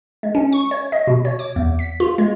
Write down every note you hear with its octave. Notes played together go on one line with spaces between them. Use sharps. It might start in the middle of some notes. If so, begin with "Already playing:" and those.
G#3
C#4
C#6
C#5
D#5
B2
C#5
D6
E2
B6
F4
G#3